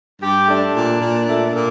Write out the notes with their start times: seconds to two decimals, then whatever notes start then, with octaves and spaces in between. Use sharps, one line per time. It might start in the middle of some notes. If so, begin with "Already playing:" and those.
0.22 G2 G4
0.48 A3 D4
0.76 A#2
1.01 A#2
1.28 A3
1.55 A#2